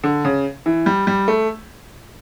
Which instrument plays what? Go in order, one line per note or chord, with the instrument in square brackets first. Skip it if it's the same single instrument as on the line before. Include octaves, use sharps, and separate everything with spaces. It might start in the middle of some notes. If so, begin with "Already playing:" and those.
[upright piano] D3
C#3
E3
G3
G3
A3